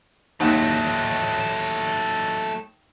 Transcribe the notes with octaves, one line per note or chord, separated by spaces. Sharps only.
D#2 F#3 A3 D#4 F#5